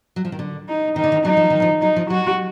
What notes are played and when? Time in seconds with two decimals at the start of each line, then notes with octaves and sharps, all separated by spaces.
0.16 F#3
0.25 F3
0.32 D#3
0.39 D3
0.69 D#4
0.96 D#3 D#4
1.04 D3
1.12 D#3
1.25 F#3 D#4
1.37 F3
1.50 D#3
1.62 F3
1.81 F#3 D#4
1.96 F3
2.10 F#3 F#4